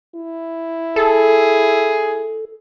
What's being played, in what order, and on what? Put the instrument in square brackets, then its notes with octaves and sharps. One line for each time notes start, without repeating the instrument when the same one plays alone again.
[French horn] E4
[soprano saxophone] G#4 [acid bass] A4